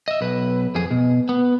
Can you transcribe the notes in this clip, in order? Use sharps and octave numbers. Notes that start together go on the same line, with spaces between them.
D#5 E5
B1 B4
F2 G#4
B2
B3